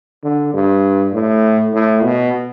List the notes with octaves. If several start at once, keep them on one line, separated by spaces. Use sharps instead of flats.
D3
G2
A2
A2
B2